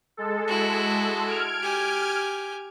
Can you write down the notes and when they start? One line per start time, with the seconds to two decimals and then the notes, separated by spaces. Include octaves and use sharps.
0.17 G#3 A4
0.48 E4 F#4
1.25 F6 G#6 D7
1.63 G4 G#5